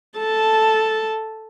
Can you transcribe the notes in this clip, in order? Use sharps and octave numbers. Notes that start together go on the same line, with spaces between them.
A4 A5